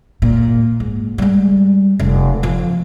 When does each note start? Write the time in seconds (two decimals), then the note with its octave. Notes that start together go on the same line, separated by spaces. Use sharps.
0.22 A#2
0.80 G#2
1.18 G3 G#3
1.99 F1
2.43 F3